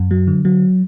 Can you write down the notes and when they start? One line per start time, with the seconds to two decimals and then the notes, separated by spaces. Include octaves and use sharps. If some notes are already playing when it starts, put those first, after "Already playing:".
Already playing: F#2
0.11 F#3
0.27 D3
0.45 F#3